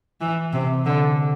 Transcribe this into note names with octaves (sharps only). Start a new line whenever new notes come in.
E3
C3
D3